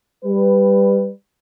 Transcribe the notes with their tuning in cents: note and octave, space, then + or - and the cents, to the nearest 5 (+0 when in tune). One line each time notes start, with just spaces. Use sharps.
G3 +10 B4 +10